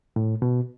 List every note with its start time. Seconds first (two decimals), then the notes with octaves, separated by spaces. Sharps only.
0.16 A2
0.42 B2